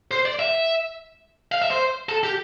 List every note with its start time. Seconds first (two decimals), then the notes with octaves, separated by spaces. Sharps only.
0.11 C5
0.26 D5
0.39 E5
1.52 F5
1.62 E5
1.71 C5
2.09 A4
2.24 G4